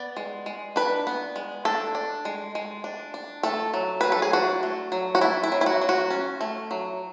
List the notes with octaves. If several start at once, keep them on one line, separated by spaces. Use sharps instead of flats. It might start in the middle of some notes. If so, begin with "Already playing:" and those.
Already playing: B3 D5
G#3
G#3
D4 B4
B3
G#3
D4 A4
D4
G#3
G#3
D4
D4
A3 A4
F#3
F#3 B4
A4
G#4
D4 F#4
A3
F#3
F#4
A3 E4
E4
F#3
E4
F#4
F#3
F#4
C#4
A3
F#3